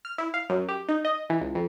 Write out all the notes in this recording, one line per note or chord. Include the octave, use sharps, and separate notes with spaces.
F6
E4
F5
F#2
G4
D#4
D#5
E3
C#2
F2